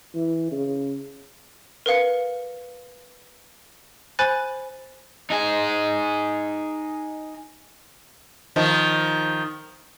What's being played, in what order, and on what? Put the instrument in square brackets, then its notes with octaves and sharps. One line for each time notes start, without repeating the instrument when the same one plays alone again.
[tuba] E3
C#3
[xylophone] A#4 B4 F5 C#7
C5 G#5 B5 F#6 A6
[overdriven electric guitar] D#4 G#4
[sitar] D#3 F3